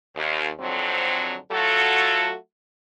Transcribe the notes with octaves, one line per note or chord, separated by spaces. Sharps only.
D#2
F2 G#2 D3 F#3 C4
F#3 A3 F4 F#4 A4